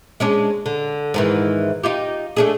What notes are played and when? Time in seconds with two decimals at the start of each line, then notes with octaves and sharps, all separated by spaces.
0.20 G#3 C#4 D4
0.66 D3
1.14 G#2 D#3 E3
1.83 D#4 F4 G4
2.37 A3 D4 G#4